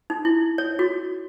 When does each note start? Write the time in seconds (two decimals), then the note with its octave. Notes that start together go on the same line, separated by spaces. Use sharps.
0.10 D#4
0.25 E4
0.58 C#5
0.79 F#4